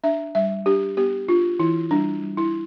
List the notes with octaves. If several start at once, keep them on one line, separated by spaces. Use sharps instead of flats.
D4 E5
G3 E5
D4 G4
B3 G4
D4 F4
E3 E4
G3 D4
G3
E4